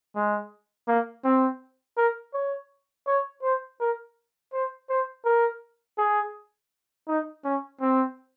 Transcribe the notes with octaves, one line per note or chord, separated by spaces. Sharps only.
G#3
A#3
C4
A#4
C#5
C#5
C5
A#4
C5
C5
A#4
G#4
D#4
C#4
C4